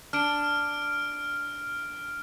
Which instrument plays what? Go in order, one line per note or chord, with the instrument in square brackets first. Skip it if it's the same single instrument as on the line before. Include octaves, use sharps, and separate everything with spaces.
[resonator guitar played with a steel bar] D4 [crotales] F6 D7